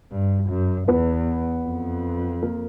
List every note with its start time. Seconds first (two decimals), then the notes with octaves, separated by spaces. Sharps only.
0.12 G2
0.50 F#2
0.88 E2 B3 B4
1.65 F2
2.42 A#3 A#4